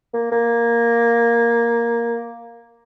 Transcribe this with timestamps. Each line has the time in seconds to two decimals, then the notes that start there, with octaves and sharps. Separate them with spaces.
0.14 A#3
0.32 A#3